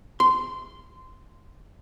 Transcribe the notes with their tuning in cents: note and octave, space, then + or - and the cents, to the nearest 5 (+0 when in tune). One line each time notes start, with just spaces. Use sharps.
C6 -15